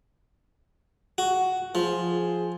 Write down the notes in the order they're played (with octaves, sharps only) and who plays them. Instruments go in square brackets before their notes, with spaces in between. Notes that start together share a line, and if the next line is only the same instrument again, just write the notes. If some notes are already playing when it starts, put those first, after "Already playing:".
[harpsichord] F#4
[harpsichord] F3 [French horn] G#4